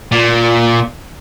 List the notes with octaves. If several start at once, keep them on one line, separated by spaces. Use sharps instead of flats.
A#2